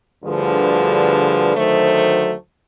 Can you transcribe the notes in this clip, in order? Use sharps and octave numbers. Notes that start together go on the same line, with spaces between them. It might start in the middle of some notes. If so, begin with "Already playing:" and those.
D2 G2 D3 F3 G#4 B4
D2 D#3 F#3 A3 C5